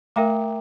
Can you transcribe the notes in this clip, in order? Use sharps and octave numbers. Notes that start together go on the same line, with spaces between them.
A3 A#4 E5 G5 A#5 D6